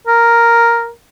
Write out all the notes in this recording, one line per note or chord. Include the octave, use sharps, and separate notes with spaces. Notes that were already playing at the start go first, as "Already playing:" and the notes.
A#4